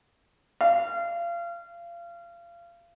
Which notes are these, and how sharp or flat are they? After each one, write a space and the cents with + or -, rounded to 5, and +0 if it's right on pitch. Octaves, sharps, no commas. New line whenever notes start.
F5 -30